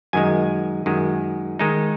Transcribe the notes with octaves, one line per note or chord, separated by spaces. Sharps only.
F#2 D#3 G#3 G#5
F#2 D#3 G#3
D#3 G#3 D#4